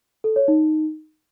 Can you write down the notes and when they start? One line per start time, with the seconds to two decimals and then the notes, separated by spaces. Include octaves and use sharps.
0.24 A4
0.36 C#5
0.48 D#4